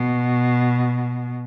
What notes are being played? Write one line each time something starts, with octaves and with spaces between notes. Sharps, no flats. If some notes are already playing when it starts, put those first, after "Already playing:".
Already playing: B2